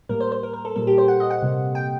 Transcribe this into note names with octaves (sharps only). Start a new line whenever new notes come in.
A2 G3 A#3 A#4
C5
C5
A#4
A#4
A4
A#2 G3 A#3 A4
G4
C5
F#5
D#5
F#5
C3 G3 A#3
G5